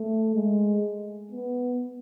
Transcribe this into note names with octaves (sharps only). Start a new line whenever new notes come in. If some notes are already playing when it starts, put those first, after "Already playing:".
Already playing: A3
G#3
B3